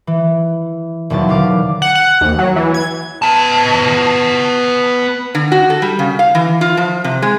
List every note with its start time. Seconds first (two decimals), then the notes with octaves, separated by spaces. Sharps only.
0.07 E3
1.10 E1 D#2 B2 F#3 A6
1.29 D3 F5 D6
1.82 F#5
1.95 F#5
2.21 D#2
2.39 F#3
2.56 E3
2.74 G#6
3.22 B3 A5
5.35 D3
5.52 F#4
5.70 A4
5.82 G3
5.99 C#3
6.19 F5
6.35 E3
6.61 F4
6.77 F3
7.04 C3
7.22 G#3